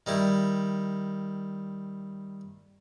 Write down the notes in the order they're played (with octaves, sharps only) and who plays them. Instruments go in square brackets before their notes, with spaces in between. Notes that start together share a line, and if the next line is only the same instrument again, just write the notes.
[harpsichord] D#3 G3 E4